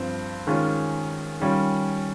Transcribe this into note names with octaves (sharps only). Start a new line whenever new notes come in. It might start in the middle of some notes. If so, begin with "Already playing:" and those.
Already playing: G2 F3 C4 F4
D#3 G#3 C#4 F4
D#3 G3 C#4 F4